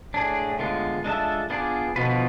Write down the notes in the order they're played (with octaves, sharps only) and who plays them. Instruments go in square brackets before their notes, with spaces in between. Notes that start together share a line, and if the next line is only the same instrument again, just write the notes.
[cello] A2 [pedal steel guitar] D4 G#4 D5
[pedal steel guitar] D3 G#3 B3 F4
G#3 D4 F4 A4 E5
B3 D4 F4 G#4 D5
[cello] B2 [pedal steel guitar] D3 F3 B3 F4 B4